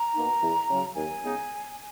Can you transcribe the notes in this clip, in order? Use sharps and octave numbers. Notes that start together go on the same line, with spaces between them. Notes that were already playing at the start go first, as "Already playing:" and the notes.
Already playing: A#5
B2 A#3 D#4
E2
C#3 F#3
D#2 G#5
C#3 G#3 B3 D#4